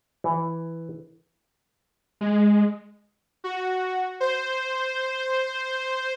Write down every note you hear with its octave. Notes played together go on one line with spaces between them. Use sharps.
E3
G#3
F#4
C5